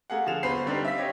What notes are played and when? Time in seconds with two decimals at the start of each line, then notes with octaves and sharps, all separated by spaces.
0.10 A3 A#3 G#4 F5 F#5
0.26 D3 F3 G#4 F5 E7 F7
0.43 G1 B3 C5 B5 C7
0.66 D3 G3 C4 D4 D#4
0.85 E5 F5 E6 B6
0.96 C4 G4 C#5 D#5